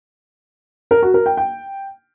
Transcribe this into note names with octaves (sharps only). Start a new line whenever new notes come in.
A#4
F#4
A#4
G5
G5